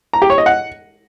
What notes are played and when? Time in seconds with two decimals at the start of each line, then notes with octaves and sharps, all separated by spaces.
0.13 A#5
0.22 G4
0.30 C#5
0.38 D#5
0.46 F#5